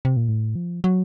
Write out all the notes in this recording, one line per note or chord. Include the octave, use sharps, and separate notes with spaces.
C3
A#2
A2
F3
F#3